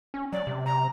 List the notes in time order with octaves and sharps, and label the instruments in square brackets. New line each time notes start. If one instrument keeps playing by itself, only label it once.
[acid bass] C#4
[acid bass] F#3 [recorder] D5
[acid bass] C3
[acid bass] C3 [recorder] A#5